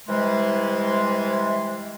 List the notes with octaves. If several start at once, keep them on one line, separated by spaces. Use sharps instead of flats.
C3 E3 G3 G#3